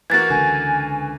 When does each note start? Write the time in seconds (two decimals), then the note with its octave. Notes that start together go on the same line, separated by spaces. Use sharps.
0.10 E3 A#3 F#4 G#6 A6
0.30 C#2 D3 G#5